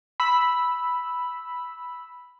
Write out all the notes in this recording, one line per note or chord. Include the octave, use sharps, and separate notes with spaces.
B5 E6